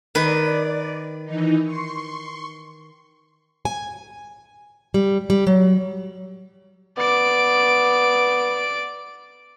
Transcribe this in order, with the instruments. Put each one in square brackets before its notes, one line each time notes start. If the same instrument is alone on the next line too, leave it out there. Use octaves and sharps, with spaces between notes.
[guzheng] D#3 B4 [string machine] D5
[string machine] E3 D#4
C6 C#6
[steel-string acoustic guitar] G#5
G3
G3
F#3
[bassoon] B3 [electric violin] D5 D7